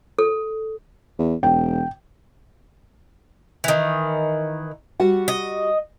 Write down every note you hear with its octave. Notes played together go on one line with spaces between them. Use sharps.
A4
E2
E1 G5
D#3 E3
G3 F#4 F#5
D#5